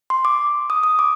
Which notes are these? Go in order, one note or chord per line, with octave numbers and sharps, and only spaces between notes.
C6
D6
D#6
D#6
D6